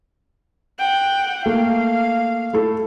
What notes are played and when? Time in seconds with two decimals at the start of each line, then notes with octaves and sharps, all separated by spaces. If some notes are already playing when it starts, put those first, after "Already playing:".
0.79 F#5 G5
1.46 A3 A#3 F5
2.53 A3 E4 A4